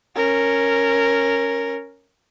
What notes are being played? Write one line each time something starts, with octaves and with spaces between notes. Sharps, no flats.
C#4 A#4